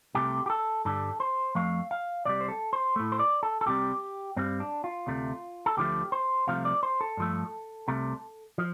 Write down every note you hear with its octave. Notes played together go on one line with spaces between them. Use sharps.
C2 C3 A3 G4
G4
A4
G2 D3 G3 A4
C5
F2 F3 A3 F5
F5
C2 C3 G3 D5
C5
A4
C5
A2 A3
C5
D5
A4
A4
C2 C3 G3 G4
G2 G3 C4
D4
F4
D2 C3 A3
A4
D2 D3 F3 A3 G4
C5
C2 C3 F3 A3 F5
D5
C5
A4
G2 F3 A3
C2 C3 A3
F3